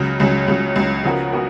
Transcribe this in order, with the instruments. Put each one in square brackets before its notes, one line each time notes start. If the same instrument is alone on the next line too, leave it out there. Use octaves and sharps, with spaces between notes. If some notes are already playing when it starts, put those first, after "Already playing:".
Already playing: [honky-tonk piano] C#2 C#3 F#3
C#2 C#3 F#3
C#2 C#3 F#3
C#2 C#3 F#3
C#3 F3 B3 F#4 A#4
B3 F#4 A#4